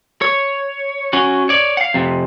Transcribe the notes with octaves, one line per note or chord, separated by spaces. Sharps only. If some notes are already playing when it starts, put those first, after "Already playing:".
C#5
C#4 F#4
C#5 D5
F5 F#5
F2 C3